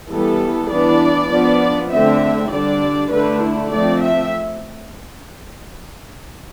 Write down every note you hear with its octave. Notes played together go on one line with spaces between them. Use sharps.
E3 G3 B3 A4
E3 B3 D4 D5
F3 B3 D4
D3 A3 C4 E5
D3 G3 D4 D5
D3 A3 D4 B4
E4
F3 A3 C4 D5
E5